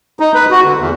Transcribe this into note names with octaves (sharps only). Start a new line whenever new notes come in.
D#4
B4
F#4
D3
E2